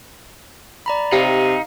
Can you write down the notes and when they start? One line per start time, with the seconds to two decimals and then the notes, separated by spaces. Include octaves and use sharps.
0.86 D5 A#5 B5
1.12 C3 D#4 G4 F5